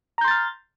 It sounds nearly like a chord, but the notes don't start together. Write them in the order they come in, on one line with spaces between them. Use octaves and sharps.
A#5 G6 C6 A6 F6